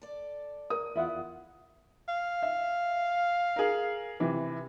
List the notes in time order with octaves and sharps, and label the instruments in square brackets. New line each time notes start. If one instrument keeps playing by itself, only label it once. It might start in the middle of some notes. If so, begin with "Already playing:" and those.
[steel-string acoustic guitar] A4 D5
[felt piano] A#4 D#6
[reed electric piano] E2 F4 F#5 [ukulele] E4 E5
[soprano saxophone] F5
[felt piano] E5
G#4 A#4
C3 E3